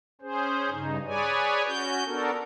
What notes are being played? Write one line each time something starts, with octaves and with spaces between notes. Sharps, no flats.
C#4 G#4 C5
G2 C#3 D#4
G#4 B4 C#5 D5 G#5
C#4 F#4 G6
B3 D4 F#4 A4 A#4